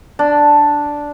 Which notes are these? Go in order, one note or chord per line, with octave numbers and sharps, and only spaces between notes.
D4